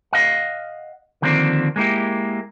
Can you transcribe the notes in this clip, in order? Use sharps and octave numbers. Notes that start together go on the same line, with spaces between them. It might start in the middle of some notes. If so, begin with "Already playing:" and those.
D#5 F5 F#5
D3 D#3 F3 A#3 C4 D4
G#3 A#3 E4 G4